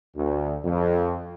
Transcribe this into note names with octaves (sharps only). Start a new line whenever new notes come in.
D2
F2